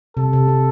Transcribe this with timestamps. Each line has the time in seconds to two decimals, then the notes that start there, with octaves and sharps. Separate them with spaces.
0.17 C3 A4
0.33 C3
0.48 C3